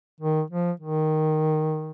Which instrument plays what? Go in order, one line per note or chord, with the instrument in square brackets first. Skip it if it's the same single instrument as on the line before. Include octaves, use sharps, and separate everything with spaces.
[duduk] D#3
F3
D#3